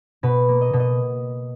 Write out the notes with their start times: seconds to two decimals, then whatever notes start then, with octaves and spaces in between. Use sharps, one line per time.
0.23 B2 B4
0.49 A#3
0.61 D#5
0.73 B2
0.80 D#5